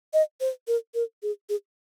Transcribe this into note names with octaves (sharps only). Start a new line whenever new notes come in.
D#5
C5
A#4
A#4
G#4
G#4